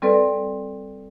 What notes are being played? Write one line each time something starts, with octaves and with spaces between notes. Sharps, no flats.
G3 C4 A4 B4 D5